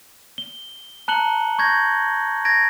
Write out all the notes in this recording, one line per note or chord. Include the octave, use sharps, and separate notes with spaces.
G7
A5 A#5 F#6 C#7 F#7 G7
C#6 G6 G#6 A#6
G#6 A#6 D7